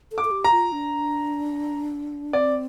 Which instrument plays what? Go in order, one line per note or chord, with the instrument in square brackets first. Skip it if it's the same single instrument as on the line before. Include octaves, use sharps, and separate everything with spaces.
[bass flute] A4
[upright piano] D6
[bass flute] A4
G4
[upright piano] A#5
[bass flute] F4
D4
[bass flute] C4 [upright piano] D5